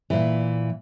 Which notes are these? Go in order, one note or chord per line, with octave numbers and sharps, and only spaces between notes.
A#2 E3